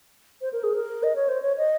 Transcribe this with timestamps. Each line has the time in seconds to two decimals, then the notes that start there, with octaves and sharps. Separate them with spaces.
0.41 C5
0.53 A#4
0.63 G#4
0.74 A#4
1.03 D#5
1.16 C#5
1.28 C5
1.42 C#5
1.58 D#5